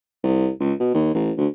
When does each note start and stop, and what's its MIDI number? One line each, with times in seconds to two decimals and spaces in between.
0.24 0.50 36
0.60 0.73 37
0.80 0.90 47
0.94 1.09 39
1.14 1.32 33
1.37 1.47 38